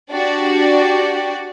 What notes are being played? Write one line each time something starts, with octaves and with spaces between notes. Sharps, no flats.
D4 F#4 G4 D5